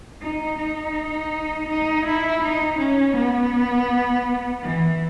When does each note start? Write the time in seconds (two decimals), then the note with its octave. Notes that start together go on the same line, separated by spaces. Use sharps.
0.22 D#4
0.58 D#4
1.69 D#4
2.05 E4
2.43 D#4
2.78 C#4
3.16 B3
4.63 E3